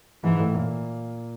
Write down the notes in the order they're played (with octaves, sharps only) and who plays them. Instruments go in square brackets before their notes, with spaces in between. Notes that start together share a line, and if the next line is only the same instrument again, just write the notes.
[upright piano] G#2 G#3 [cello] E3
[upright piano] A2 A3
A#2 A#3